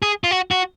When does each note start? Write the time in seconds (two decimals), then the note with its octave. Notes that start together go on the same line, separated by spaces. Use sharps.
0.02 G#4
0.24 F4
0.31 F#4
0.51 F#4